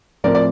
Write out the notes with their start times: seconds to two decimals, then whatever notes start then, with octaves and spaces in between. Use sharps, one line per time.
0.24 A2 F3 C4 A#4 D5
0.35 D5